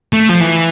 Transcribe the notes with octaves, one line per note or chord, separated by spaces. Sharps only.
A3
F3
E3